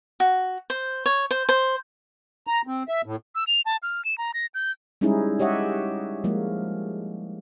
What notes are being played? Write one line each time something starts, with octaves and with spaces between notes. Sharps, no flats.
F#4
C5
C#5
C5
C5
A#5
C4
E5
A2
E6
F7
A5
F6
E7
A#5
A#6
G6
G3 G#3 C#4 D#4 E4 G#4
G4 C#5 D#5 E5 F#5
F3 G#3 A#3